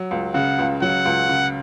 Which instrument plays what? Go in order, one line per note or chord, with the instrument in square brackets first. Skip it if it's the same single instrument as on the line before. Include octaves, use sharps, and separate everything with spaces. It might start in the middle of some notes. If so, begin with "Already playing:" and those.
Already playing: [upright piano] F#3
C#2
[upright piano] C#3 [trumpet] F#5
[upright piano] C#2
[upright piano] F#3 [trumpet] F#5
[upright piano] C#2
C#3